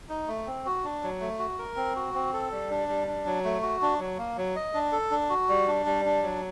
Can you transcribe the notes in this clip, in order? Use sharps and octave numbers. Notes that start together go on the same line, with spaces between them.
D#4
A3
C4
F#4
D4
F#3
A3
F#4
A#4
C4
F#4
C4
A4
G3
D4
G3
D4
F#3
A3
F#4
D4
F#3
A#3
F#3
D#5
D4
A4
D4
F#4
G3
D4
G3
D4
F#3